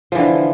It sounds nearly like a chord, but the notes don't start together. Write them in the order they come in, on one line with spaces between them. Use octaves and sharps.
F3 E3 D3